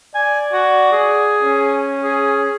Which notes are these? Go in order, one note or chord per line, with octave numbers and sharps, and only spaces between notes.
D5 G#5
F#4
G#4
C#4
G#4